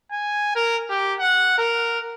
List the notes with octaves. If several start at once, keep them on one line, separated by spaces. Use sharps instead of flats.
G#5
A#4
G4
F#5
A#4